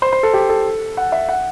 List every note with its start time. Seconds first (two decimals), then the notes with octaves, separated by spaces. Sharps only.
0.02 C5
0.13 C5
0.23 A4
0.34 G4
0.50 A4
0.97 F#5
1.12 E5
1.29 F#5